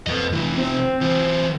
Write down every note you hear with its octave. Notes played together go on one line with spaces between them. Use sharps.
F2 B4 D#5
C3 E3 F3
C4
E3 F4